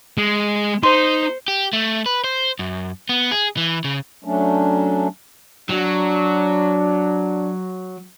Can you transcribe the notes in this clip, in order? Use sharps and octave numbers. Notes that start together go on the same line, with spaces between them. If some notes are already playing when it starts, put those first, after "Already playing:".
G#3
D#4 C5 C6
G4
A3
B4
C5
F#2
B3
G#4
E3
C#3
F#3 A3 C#4 D4
F#3 D4